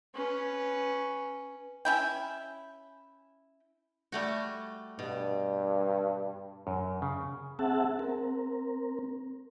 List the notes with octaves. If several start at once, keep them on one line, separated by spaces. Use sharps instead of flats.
C#4 B4
C#4 E4 G5
G3 A3 F#4
G2 B2
F#2
C#3
C4 G#4 E5 F#5 A5
C4 A#4